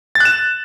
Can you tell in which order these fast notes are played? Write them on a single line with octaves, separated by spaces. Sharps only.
A6 F#6 E7